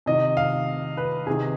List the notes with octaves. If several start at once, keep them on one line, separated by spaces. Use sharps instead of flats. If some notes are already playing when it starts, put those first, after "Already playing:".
C3 D#3 D#5
F5
B4
C3 D#3 G#4